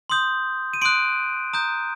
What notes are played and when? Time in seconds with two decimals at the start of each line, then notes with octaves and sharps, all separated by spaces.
0.10 C6 D#6 G6
0.73 D#7
0.82 C6 D#6 F#6 D7
1.53 A#5 D#6 G6